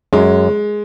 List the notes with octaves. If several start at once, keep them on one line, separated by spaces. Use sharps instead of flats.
F#2 G#3